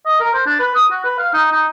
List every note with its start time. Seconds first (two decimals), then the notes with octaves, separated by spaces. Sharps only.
0.06 D#5
0.20 A#4
0.34 C5
0.46 D4
0.60 B4
0.75 D#6
0.91 F#4
1.04 B4
1.19 F5
1.34 D#4
1.52 D#4